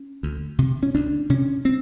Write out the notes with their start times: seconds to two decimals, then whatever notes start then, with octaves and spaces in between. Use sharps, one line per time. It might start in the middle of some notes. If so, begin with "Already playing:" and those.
Already playing: C#4
0.23 D2
0.59 C3
0.83 C#4
0.94 D2 D4
1.30 C3 C#4
1.65 C4